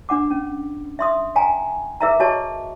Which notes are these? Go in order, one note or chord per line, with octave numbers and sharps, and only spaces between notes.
D4 F#5 D6
C#4
E5 C6 D#6
F5 G5 G#5 A#5
G#4 A#4 B4 E5 F5 A#5
F#4 G#4 C#5 D#5 A5 C#6